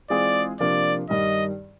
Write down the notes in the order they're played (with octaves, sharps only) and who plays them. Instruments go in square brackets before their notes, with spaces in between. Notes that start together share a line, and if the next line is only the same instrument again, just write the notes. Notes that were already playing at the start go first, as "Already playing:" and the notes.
[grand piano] E3 G#3 C4 F4 G#4 [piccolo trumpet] D5
[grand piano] C3 F3 A#3 D4 [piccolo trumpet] D5
[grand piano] G2 D#3 G3 [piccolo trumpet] D#5